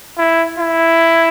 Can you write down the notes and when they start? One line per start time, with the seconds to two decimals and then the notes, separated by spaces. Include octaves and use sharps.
0.18 E4
0.59 E4